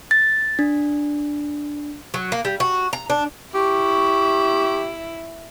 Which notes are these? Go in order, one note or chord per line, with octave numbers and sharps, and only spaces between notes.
A6
D4
F#3
A#3
G3
F#4
A#5
D4
E4 G4 C#6